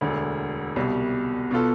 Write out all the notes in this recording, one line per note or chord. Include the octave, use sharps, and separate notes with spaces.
E1 D2 D3
C2 B2 G3
B2 B3 F4 A4